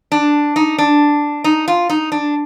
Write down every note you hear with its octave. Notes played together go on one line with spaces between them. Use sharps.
D4
D#4
D4
D#4
F4
D#4
D4